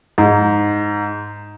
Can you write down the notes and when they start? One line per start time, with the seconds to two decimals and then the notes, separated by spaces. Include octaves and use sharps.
0.18 G#2